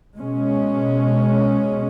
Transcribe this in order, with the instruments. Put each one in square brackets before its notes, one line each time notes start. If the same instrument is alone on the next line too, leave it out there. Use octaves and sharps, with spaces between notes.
[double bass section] B2 G#3 C#4